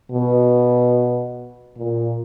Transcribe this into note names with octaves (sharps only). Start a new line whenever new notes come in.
B2
A#2